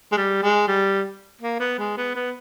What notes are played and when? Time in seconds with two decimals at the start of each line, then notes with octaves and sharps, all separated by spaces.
0.12 G#3
0.17 G3
0.43 G#3
0.67 G3
1.41 A#3
1.60 B3
1.78 G#3
1.97 B3
2.15 B3